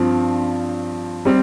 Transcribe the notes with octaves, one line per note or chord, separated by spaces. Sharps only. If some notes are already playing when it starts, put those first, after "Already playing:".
Already playing: G2 F3 C4
G3 C4